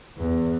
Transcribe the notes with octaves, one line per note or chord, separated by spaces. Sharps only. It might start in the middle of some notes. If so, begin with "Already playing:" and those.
E2